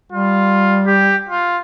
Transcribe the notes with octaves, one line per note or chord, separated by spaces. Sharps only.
G3 F4
G4
F4